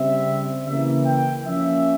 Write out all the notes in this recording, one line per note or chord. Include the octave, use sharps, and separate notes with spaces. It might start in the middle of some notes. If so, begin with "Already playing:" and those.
Already playing: C#3 G3 C4 E5
C#3 E3 A#3 E5
G5
F3 A#3 C#4 E5